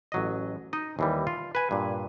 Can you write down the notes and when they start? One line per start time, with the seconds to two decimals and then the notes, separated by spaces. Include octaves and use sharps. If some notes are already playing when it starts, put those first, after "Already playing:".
0.12 A1 F#3 D#5
0.73 D#4 D#5
0.99 D#2 E3 G3
1.27 F4
1.55 B4 G#5
1.71 G2 A#2